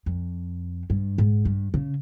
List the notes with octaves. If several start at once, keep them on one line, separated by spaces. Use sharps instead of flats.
F2
G2
G#2
G2
C#3